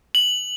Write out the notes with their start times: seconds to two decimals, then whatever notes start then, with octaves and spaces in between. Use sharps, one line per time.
0.15 F#7